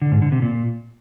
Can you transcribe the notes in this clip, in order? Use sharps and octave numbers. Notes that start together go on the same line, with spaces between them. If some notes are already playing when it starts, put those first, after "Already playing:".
D3
G#2
D3
C3
A#2